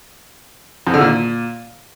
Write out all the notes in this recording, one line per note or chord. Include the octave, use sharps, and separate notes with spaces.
F2
D3
A#2